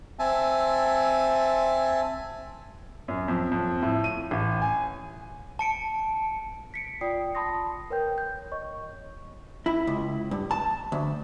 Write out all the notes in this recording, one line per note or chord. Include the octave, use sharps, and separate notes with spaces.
C4 E5 G#5 A5
F#2
F2
F2
A2
D#7
A1
G#5
A5 C#7 D7
B6 C#7 D7
F4 D5 G5 D#6 C7
A5 B5 C6 D#6 A#6
A#4 B4 C#5 G5 G6
G6
C#5 D#5 C#6
E4
C#2
G2
A5
D2